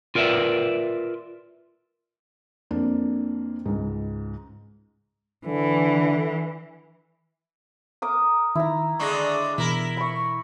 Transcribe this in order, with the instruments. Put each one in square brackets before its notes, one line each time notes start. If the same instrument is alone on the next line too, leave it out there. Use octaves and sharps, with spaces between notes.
[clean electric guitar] F4 A#4 B4 D5 E5
[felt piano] F2 A#3 D4
C#2 G#2
[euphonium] D3 [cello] E3
[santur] A#4 D6 D#6
[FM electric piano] D#3 [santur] E4 A#5
[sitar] D3 G#3 D4 [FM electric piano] C#6 A#6
[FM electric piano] B2 E3 [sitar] E4 A#4
[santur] B5 C#6